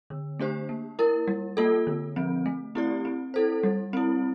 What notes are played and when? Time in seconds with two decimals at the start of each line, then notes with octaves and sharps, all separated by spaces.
0.10 D3
0.39 A3 D4 G4 C5
0.69 A#3
0.99 E4 A#4
1.28 G3
1.57 A#3 F4 A4
1.87 D3
2.16 F3 C4
2.46 A3
2.75 C4 E4 G4 D5
3.05 C4
3.34 E4 A4 C5
3.63 G3
3.93 C4 E4